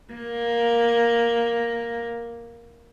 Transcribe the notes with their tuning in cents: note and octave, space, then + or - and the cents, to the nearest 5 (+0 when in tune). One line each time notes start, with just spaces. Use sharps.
A#3 +5